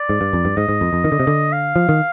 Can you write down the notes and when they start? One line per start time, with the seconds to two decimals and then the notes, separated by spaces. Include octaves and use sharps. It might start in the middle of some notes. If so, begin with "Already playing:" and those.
Already playing: D5
0.09 G#2
0.21 G2
0.33 F2
0.45 G2
0.56 G#2 D#5
0.69 G#2
0.81 F2
0.93 F2
1.04 D#3
1.12 D3
1.20 C3
1.27 D3
1.52 F5
1.76 F3
1.89 D#3